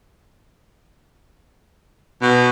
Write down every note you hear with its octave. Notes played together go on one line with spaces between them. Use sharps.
B2